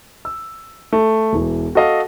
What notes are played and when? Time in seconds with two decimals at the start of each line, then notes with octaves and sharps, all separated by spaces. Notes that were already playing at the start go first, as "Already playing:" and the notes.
0.25 E6
0.93 A3
1.33 E1 E3
1.75 F#4 A4 D#5 F5 F#5